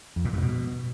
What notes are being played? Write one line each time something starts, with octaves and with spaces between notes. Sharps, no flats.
F2
A#2
G2
B2